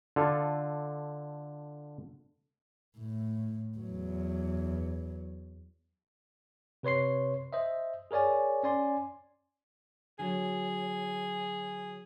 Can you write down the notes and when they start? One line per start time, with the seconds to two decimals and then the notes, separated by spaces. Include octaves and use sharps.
0.16 D3 F4 A4
2.98 A2
3.78 E2 F#3
6.83 C3 B4 C#5 C6 C7
7.53 C5 D#5 E5
8.11 G#4 A#4 C#5 D5 G#5
8.63 C#4 D5 G#5 C6
10.19 D3 F#3 G#4 C#5